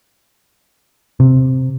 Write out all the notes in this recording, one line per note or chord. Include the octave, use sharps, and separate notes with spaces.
C3